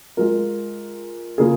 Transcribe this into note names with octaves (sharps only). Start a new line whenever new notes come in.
G#3 F4 A#4
C#3 A#3 F4 G#4